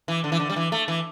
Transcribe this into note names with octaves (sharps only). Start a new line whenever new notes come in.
E3
D3
E3
D3
G3
E3
A3
E3